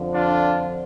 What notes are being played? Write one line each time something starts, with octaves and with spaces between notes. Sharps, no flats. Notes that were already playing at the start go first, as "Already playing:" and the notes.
Already playing: F2 D3 F3
D4 F4